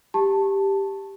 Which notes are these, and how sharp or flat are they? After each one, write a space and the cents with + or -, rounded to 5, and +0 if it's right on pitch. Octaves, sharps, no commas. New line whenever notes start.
G4 +5 A5 +0